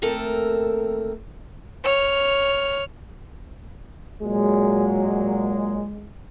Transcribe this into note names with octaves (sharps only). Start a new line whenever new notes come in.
D#2 A3 C4 A4 A#4
C#5 F6
A#2 F#3 G#3